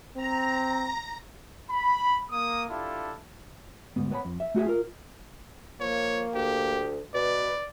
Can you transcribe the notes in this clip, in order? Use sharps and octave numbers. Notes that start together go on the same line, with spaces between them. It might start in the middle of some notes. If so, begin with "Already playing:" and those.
C4 A#5
B5
A#3 D#6
D4 E4 F4 G4 A4
D2 G#2 B3
B3 C#5 A5 B5
F2
E5
A3 F#4 G#4 E5
F4 A#4
F3 A#3 C#5
D2 G4
B2 B4 D5